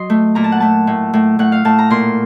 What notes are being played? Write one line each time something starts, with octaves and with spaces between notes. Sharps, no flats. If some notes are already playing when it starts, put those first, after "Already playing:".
Already playing: F#3 D#5 C6
A3
A#2 A#5
A5
F#5
A3 A5
A2
A2
A2 F#5
F5
A2 A5
A#5
A#2 C6